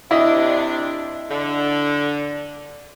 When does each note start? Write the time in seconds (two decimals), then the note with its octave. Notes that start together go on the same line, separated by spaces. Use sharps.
0.11 C3 D4 E4 D#5
1.30 D3